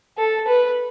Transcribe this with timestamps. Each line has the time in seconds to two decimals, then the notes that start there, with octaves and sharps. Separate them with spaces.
0.18 A4
0.48 B4